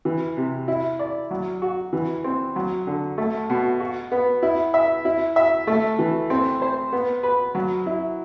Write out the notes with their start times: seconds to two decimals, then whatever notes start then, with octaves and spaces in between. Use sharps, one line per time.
0.05 E3
0.37 C3
0.68 E4
0.99 D5
1.31 F#3
1.62 F#4
1.93 E3
2.24 C4
2.56 F#3
2.87 D3
3.18 A3
3.50 B2
3.80 F#4
4.12 B3
4.42 E4
4.74 E5
5.05 E4
5.36 E5
5.67 A3
5.99 E3
6.30 C4
6.62 C5
6.93 B3
7.23 B4
7.55 F#3
7.86 E4